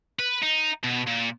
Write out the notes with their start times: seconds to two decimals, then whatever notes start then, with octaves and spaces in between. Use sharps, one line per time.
0.19 B4
0.43 D#4
0.84 B2
1.07 A#2